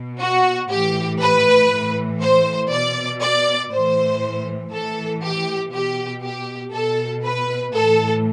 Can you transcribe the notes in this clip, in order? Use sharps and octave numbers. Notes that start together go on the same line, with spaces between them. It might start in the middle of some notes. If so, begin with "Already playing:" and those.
Already playing: B2
F#4
A2 E3 G4
B4
A2 E3
C5
B2 D5
D5
A2 E3 C5
A2 E3 A4
G4
B2 G4
G4
B2 A4
B4
A2 E3 A4